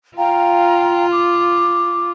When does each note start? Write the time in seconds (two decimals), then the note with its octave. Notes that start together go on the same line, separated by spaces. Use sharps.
0.18 F4 F5 G5 A#5
1.12 D6